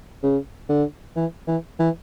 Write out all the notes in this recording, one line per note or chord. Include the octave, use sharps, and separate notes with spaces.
C#3
D3
E3
E3
E3